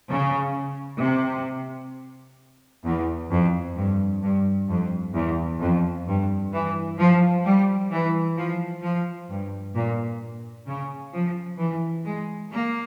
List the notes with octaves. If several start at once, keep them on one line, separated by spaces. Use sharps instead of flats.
C#3
C3
E2
F2
G2
G2
F2
E2
F2
G2
E3
F3
G3
E3
F3
F3
G2
A#2
C#3
F3
E3
G#3
A#3